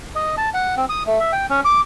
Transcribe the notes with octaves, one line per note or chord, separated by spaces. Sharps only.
D#5
A5
F#5
C4
D#6
A3
E5
G5
C#4
D6